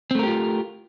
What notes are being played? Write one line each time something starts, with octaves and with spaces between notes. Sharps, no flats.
A3 C4 F4 G4 A#4